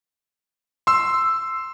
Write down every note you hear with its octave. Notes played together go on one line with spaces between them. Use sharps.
C6 E6